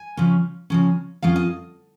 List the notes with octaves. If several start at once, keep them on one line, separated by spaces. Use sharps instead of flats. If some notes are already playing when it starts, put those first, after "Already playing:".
Already playing: G#5
C#3 F3 C#4
C#3 F3 C#4
F2 F3 C#4 F4 F5
D#5